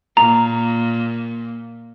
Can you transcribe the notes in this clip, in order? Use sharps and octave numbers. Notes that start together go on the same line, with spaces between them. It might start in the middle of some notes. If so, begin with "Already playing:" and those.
A#2 A#5